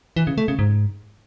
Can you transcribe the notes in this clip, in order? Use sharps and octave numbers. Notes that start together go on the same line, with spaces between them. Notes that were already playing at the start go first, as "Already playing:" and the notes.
E3
C#3
A3
C#3
G#2